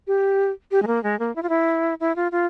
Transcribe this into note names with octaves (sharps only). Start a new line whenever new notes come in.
G4
G4
G#3
A#3
G#3
A#3
E4
F4
E4
E4
F4
F4